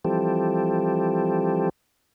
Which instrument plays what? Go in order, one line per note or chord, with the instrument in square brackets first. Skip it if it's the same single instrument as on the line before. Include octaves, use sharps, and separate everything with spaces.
[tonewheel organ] E3 F3 G3 C4 G4 A4